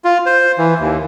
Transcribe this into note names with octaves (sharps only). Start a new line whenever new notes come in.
F4
C5
E3
D#2